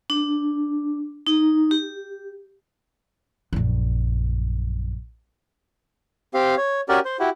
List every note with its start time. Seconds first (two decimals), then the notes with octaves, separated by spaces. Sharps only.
0.10 D4
1.27 D#4
1.71 G4
3.53 A#1 F#2
6.34 C4 G4 F5
6.57 C#5
6.89 C#4 F#4 G4 A#4 D5
7.05 C5
7.20 E4 F#4 G4